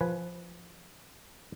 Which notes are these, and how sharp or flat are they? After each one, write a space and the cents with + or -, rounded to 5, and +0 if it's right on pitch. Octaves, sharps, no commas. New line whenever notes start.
F3 +0 B4 -5 G#5 +10